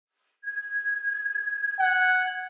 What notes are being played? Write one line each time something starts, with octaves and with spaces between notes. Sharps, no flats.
G#6
F#5